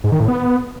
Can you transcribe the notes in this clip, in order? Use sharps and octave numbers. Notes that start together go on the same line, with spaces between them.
G#2
D#3
A2
B3